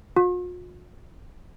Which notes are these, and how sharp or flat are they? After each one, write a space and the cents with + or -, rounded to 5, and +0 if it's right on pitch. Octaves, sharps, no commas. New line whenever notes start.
F4 +45